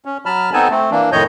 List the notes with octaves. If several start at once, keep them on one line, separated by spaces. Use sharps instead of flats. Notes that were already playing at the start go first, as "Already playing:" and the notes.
C#4
F#3 A5 B5 F6
B3 C4 D#4 A4 G#5 A5
A3 C4
E3 A#3 D4
F2 A2 D#3 C#5 D#5 G6